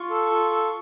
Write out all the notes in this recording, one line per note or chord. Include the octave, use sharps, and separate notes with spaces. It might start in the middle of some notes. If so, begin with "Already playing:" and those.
Already playing: F4 C#6
A4
F4
A4